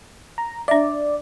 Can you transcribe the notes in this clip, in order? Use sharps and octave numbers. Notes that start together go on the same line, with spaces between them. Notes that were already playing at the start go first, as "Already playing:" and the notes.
A#5
D4 D5 E5